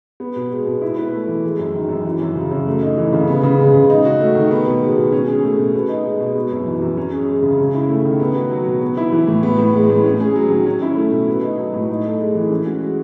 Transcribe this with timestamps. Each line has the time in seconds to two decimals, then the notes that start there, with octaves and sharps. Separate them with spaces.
0.20 B3
0.36 B2
0.52 G#3
0.67 B2
0.82 E4
0.97 B4
1.13 A3
1.28 E3
1.44 G#3
1.59 F#2
1.74 D#3
1.89 F#2
2.05 E3
2.21 F#2
2.36 C#3
2.51 F#2
2.67 A3
2.82 D#4
2.97 E3
3.13 C#3
3.28 B3
3.43 C#3
3.59 G#3
3.74 C#3
3.90 D#4
4.05 F#4
4.20 A3
4.35 D#3
4.51 B3
4.67 B2
4.81 G#3
4.97 B2
5.12 C#4
5.27 G#4
5.43 A3
5.58 B2
5.74 B3
5.89 D#4
6.05 G#3
6.20 B2
6.35 B3
6.51 F#2
6.66 E3
6.82 F#2
6.97 C#4
7.13 G#4
7.28 G#3
7.43 C#3
7.58 C#4
7.74 E4
7.89 A3
8.05 D#3
8.20 B3
8.35 F#4
8.51 F#3
8.67 B2
8.81 B3
8.97 E4
9.12 E3
9.28 A2
9.43 B3
9.59 A2
9.74 G#3
9.90 A2
10.04 C#4
10.20 G#4
10.36 F#3
10.50 D#3
10.66 C#4
10.82 E4
10.96 A3
11.12 B2
11.28 B3
11.43 D#4
11.58 F#3
11.74 A2
11.89 D#4
12.05 A4
12.20 G#3
12.35 E3
12.50 C#4
12.66 F#4
12.81 G#3